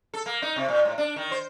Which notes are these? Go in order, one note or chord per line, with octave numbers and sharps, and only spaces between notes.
A4
A#3
D#4
C3
A#2
A2
D4
D#3
C5